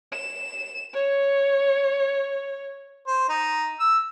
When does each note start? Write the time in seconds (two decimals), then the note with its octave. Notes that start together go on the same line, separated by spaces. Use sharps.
0.12 E7
0.93 C#5
3.07 C5
3.29 D#4
3.80 E6